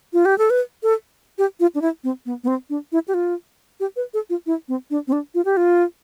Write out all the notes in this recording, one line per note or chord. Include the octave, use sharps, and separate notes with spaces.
F4
G4
A4
B4
A4
G4
F4
D4
E4
C4
B3
B3
C4
D4
E4
G4
F4
G4
B4
A4
F4
E4
C4
D4
C4
D4
F4
G4
F4